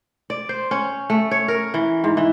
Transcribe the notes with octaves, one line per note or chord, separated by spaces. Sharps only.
D5
C5
C#4
A3
C#5
A#4
E3
G#2
E3